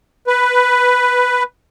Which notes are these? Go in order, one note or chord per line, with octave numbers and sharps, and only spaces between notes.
B4